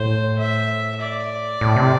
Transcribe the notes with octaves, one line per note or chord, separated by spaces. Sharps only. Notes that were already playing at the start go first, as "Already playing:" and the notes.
Already playing: A2 C5
E5
D5
A2
C3